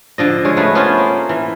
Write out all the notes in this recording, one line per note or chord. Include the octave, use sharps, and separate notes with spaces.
D3 F3 D#5
C#3 G#3 C#5
A3 B3 G#4 B4
B3 C#4 F4 C5
A#3
E3